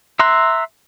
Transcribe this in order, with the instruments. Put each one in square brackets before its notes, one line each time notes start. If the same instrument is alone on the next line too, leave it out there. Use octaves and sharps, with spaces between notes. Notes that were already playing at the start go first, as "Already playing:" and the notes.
[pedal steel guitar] E5 A#5 C6 E6 F#6